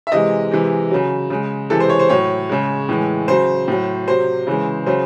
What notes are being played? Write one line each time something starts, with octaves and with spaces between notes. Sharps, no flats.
E5
C3 E3 G#3 D#5
C3 E3 G#3
C#3 F#3
C#3 G#3
C3 E3 G#3 A4
C5
C#5
C5
A2 F#3 C#5
C#3 G#3
A2 E3 G#3
C#3 F#3 C5
A2 F#3
C3 F#3 C5
C#3 E3 G#3
C#3 F#3 C5